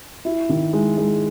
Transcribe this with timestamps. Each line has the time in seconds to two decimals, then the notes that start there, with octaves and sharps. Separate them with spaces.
0.25 E4
0.49 D#3
0.73 G#3
0.97 G#3